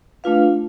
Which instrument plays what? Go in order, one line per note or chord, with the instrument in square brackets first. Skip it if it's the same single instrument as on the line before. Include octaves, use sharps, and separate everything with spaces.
[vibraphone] A3 D4 F4 B4 F5